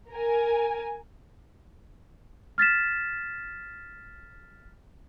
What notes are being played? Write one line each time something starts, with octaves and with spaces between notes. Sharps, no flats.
A#4 G#5
F6 A6 B6 E7